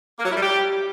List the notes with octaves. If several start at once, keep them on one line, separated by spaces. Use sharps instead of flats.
A#3
F#3
E4
G3
G4